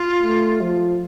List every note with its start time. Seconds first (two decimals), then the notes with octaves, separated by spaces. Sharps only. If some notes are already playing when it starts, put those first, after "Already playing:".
Already playing: F4
0.23 A3
0.61 F3